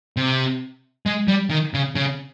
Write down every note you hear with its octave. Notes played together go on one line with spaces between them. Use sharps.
C3
G#3
G3
D#3
C#3
C#3